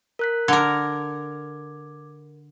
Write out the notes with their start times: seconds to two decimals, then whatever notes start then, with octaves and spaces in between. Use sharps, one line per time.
0.19 A#4 F#6 B6
0.48 D3 A#4 D6 G#6